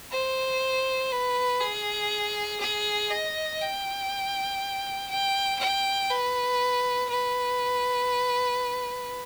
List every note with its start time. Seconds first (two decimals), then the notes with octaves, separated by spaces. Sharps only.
0.11 C5
1.12 B4
1.60 G#4
2.60 G#4
3.11 D#5
3.61 G5
5.10 G5
5.59 G5
6.10 B4
7.09 B4